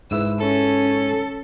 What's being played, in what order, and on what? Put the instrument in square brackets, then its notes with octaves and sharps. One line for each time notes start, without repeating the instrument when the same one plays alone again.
[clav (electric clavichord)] G#2 E4 B4 [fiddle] E6
[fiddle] C#4 [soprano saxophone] A4